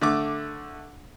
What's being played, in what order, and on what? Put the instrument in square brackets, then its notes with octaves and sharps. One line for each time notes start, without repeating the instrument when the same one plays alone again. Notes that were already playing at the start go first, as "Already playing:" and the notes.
[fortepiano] D3 A3 D6